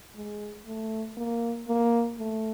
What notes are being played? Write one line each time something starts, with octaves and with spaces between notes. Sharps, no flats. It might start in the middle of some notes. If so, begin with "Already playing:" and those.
G#3
A3
A#3
A#3
A3